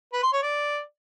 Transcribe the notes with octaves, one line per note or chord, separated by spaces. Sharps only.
B4
C6
C#5
D5